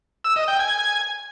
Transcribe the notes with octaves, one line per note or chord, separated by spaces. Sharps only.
E6
D#5
G5
G#5